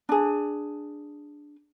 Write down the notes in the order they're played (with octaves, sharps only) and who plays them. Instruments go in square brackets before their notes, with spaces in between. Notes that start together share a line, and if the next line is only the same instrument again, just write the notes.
[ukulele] D4 G#4